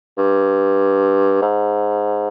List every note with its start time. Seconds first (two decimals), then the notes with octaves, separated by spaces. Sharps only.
0.17 G2
1.42 G#2